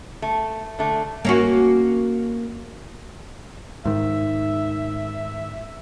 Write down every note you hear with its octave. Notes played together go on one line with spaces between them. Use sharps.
A3
D3 A3
A#3 C#4 F#4
G#2 D#3 E5